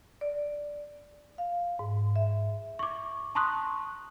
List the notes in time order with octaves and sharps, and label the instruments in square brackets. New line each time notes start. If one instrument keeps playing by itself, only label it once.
[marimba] D5
F5
G#2
E5
[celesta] C#6 D6
A5 A#5 C6 C#6 D#6 F#6